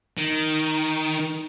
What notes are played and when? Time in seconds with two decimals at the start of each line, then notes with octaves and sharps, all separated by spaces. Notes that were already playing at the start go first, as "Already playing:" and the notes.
0.18 D#3